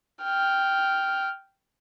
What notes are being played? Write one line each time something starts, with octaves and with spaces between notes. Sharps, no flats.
G5 F6